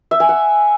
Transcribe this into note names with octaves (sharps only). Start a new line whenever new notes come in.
E5
G#5
F#5